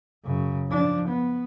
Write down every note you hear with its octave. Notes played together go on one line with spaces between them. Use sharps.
F#2 C#3
F3 D4
B3